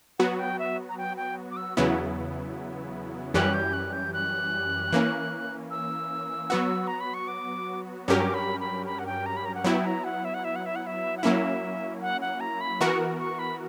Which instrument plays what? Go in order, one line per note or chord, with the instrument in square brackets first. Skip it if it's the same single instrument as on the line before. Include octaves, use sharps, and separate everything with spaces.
[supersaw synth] F#3 B3 F#4 [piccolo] F#5
[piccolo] G5
E5
A#5
G5
G5
D6
E6
[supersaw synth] E2 C#3 F#3 B3 E4
[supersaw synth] F#2 E3 G3 C#4 G4 [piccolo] F#6
[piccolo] G6
F#6
G6
F#6
[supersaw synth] E3 A#3 C#4
[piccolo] E6
[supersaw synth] F#3 B3 F#4
[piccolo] A#5
B5
C#6
D6
[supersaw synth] G2 F#3 C#4 G4 A#4 [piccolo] D6
[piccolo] B5
B5
B5
F#5
G5
A#5
B5
A#5
F#5
[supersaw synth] F#3 B3 E4 [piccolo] G5
[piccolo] A#5
F#5
E5
F#5
E5
F#5
E5
F#5
E5
F#5
[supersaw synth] F#3 A#3 C#4 E4 [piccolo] E5
[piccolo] F#5
F#5
A#5
B5
[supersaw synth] E3 B3 F#4 A#4 [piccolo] C#6
[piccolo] C#6
B5